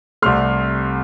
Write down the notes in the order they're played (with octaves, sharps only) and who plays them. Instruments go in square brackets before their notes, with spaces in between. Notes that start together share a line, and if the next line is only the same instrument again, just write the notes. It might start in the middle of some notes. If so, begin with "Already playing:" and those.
[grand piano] C2 C3 A3 C6 F6